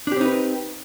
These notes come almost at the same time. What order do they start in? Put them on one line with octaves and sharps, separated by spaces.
D4 G4 C4 D#4 B4